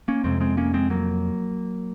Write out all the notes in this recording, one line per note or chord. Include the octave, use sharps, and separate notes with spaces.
A#3 C#4
F2 C3 G#3 C4
G#3 C4
A#3 C#4
G#3 C4
F#3 A#3